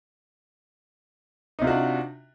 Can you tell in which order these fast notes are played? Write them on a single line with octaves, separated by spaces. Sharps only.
D#4 C3 F4 F#4 D4